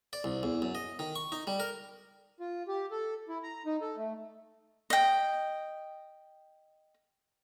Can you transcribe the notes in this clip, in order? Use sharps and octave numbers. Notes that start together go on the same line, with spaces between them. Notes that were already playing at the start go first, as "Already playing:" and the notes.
D5
C2
E2
F#2
D#5
D#3
C#6
D#4
G3
A#4
F4
G4
A4
E4
A#5
D#4
A4
A3
D#5 G5